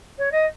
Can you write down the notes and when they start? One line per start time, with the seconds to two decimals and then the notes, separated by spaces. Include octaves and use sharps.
0.18 C#5
0.32 D#5